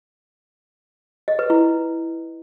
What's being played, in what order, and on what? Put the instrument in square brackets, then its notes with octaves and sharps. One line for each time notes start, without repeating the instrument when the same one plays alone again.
[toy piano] D#5
B4
E4